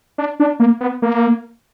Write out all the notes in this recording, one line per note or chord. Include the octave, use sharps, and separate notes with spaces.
D4
D4
A#3
B3
A#3